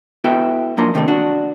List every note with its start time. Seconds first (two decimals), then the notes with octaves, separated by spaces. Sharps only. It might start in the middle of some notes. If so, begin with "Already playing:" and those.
0.24 B3 E4 F#4 A4 E5 G5
0.77 F#2 F3 A#3 D4 A#5 C6
0.94 A2 C3 D#3 F#3 G3 A3
1.08 D4 F#4